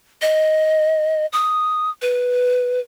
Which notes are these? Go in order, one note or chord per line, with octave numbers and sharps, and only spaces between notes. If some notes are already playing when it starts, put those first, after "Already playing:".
D#5
D#6
B4